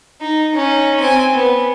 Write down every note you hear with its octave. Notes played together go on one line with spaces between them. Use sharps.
D#4
C#4 D#4
C4 G#5
B3